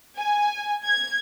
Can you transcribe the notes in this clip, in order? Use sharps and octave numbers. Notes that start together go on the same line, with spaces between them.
G#5
G#6